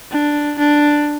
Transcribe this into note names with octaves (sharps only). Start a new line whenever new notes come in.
D4
D4